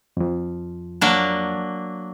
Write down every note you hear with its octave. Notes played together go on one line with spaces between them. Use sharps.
F2 F3
F#3 A#3 D4